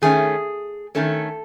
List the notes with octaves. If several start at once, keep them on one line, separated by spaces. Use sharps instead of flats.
D#3 A3 C#4 G#4
D#3 A3 C#4 A4